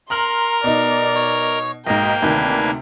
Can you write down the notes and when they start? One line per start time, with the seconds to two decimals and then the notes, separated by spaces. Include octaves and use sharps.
0.10 A#4 A#5 C6 F6 F#7
0.64 B2 D#4 D5
1.15 C#5
1.87 B1 G#2 A#3 D#5 G5
2.22 D2 C3 D#3 D4 B4 G#5